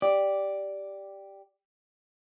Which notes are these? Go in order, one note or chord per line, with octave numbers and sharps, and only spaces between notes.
G4 D5